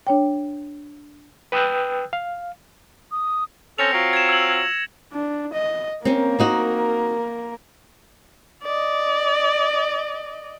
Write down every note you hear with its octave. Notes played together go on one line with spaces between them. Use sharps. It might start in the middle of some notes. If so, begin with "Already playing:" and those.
D4 C#5 G5
B4 G5 D#6 E6 F#6 G6
F5
D#6
C4 C#4 A4 A#6 C#7 F7
F#3 C4 F4
G#6 E7
E6 F#7
D4
D#5
A#3 C4 C#4 A#4
C4 D#4 F#4
D5 D#5